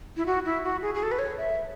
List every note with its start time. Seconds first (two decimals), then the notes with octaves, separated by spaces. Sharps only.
0.17 E4
0.26 F#4
0.45 E4
0.64 F#4
0.82 G#4
0.95 G#4
1.03 A4
1.12 B4
1.19 C#5
1.38 E5